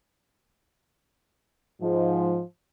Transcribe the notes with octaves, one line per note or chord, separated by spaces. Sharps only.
G#2 F3